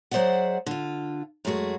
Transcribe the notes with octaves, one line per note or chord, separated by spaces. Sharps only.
F#3 G#4 C5 D5 E5 F#5
D3 F4
F#2 G#3 A3 F#4 G#4